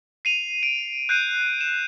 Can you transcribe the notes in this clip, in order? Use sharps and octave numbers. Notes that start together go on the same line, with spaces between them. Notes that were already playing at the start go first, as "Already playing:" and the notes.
C7 D#7 F7
D7
F#6 G6 C7 D#7
E7